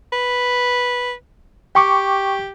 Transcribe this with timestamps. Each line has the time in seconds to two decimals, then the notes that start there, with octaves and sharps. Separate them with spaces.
0.12 B4
1.75 G4 G5 C#6 D6